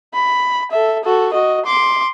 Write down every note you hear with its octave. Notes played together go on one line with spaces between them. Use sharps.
B5
A4 E5
F#4 A4
F#4 D#5
C6 D6